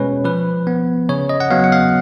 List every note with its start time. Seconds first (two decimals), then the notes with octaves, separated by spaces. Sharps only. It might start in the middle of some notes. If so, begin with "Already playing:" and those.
Already playing: B2 G#3 C#4 B4 C#5
0.24 F3 B4
0.67 B3
1.09 C#3 C#5
1.29 D#5
1.40 F#5
1.50 F#3 B3 F5
1.64 F#5
1.72 F5